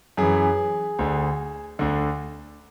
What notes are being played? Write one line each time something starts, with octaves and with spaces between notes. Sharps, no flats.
F#2 E3 G#4
D2 D3
D2 D3